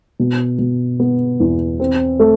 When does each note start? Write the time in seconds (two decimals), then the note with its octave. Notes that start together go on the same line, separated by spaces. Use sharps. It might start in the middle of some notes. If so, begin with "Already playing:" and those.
0.20 B2
0.59 B2
1.00 B3
1.40 E2
1.80 C4
2.19 A3